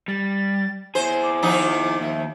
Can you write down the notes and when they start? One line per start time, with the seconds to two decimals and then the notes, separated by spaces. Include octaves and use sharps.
0.08 G3 A6
0.95 E4 G#4 C5 C#5
1.22 D6
1.42 D#3 F3 D#4
2.00 D#2 E5